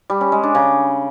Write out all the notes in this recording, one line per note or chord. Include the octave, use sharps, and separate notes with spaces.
G3
C#4
G#3
D4
C#3